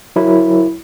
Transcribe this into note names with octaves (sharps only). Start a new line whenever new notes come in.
F#3 E4 A#4